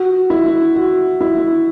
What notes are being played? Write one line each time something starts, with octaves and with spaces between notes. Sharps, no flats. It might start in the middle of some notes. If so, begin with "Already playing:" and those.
Already playing: F#4
E4
F#4
E4